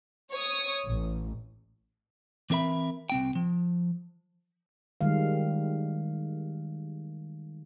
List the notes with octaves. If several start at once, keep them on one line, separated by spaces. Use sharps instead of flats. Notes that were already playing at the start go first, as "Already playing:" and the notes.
C#5 D#6
A1
E3 C4 A#4 E5 B5
C2 C4 G5
F3
D#3 G3 G#3 F5